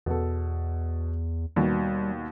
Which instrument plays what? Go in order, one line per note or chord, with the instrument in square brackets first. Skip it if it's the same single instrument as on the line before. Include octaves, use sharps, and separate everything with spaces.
[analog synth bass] E2 [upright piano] B2 A4
[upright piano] D#2 B2 [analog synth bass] G3